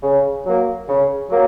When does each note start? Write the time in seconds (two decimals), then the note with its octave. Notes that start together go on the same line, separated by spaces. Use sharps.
0.02 C#3
0.45 F#3 A#3
0.88 C#3
1.30 F#3 A#3